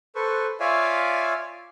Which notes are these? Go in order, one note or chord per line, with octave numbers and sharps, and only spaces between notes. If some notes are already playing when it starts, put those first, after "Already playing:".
A4 B4 C5 C#6
F4 C#5 D5 E5 F5 G#5